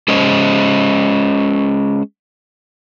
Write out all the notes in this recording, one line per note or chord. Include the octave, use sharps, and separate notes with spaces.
G#3 C#4 C5 D#5